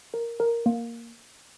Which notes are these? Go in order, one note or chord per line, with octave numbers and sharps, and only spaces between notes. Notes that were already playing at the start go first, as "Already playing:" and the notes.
A#4
A#4
A#3